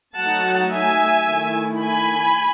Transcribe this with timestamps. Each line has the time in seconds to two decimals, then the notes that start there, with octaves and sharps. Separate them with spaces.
0.17 F#3 A3 D#4 F#5 A5
0.73 E5 G#5
1.28 D#3 A3 E4
1.82 G#5 B5